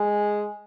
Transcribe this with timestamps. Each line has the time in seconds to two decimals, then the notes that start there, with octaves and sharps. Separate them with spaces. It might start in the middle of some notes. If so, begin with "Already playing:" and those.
Already playing: G#3